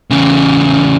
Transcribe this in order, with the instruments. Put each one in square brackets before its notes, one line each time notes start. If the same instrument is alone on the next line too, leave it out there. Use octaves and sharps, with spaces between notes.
[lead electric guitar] E2 C#3